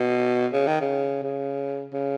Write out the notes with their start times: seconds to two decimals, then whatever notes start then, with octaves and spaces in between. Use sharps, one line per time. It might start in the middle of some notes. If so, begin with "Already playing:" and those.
Already playing: B2
0.53 C#3
0.67 D#3
0.81 C#3
1.23 C#3
1.93 C#3